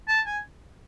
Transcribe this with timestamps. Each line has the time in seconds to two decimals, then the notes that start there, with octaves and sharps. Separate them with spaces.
0.08 A5
0.26 G#5